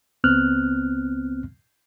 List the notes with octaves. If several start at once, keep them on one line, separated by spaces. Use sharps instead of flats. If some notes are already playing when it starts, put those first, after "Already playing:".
C#2 B3 C4 F6 F#6